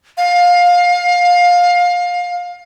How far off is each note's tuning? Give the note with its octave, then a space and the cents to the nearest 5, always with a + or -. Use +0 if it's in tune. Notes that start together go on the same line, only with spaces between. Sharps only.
F5 +25